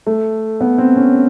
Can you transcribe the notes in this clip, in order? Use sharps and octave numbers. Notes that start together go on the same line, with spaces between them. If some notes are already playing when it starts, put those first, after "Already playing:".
A3
B3
C4
C#4